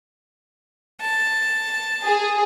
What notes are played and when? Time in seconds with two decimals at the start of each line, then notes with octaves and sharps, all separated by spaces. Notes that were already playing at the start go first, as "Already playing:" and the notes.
1.01 A5
2.04 G#4